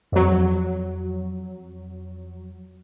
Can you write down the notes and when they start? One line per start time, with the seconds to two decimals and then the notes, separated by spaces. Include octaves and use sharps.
0.12 F2 F#3